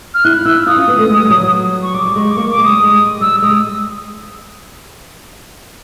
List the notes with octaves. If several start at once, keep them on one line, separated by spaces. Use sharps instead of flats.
F6
E4 F#6
E4 E6
F4 D#6
C#4
B3
A3
G#3
G3
F#3
F#3
C#6
G3 D6
G3
G#3 C#6
D6
A#3 C#6
D6
G#3
D#6
G3
G#3
G3 E6
G3
G#3 D#6